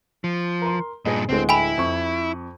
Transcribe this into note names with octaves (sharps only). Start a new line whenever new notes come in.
F3
A#4 C6
G2 A#2 G#4 D#5
D1 D3 G#3 C4
E4 G5 G#5 B5
F2 C#6